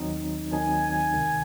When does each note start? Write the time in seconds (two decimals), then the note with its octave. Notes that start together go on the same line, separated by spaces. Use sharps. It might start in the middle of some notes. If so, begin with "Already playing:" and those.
Already playing: D#2 D#3 F#3 C4 D#4
0.52 D#2 D#3 F#3 C4 D#4 G#5
1.14 C#2 C3 D#3